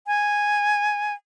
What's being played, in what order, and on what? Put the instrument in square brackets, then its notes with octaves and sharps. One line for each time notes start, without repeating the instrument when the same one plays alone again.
[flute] G#5